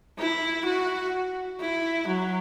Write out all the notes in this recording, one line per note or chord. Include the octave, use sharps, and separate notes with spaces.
E4
F#4
E4
F#3